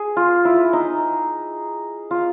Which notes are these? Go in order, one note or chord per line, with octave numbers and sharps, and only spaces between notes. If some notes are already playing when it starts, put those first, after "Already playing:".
Already playing: G#4
F4
E4
D#4
F4